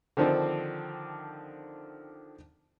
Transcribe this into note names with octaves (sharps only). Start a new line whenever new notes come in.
D3 D#3 F3 C4 D4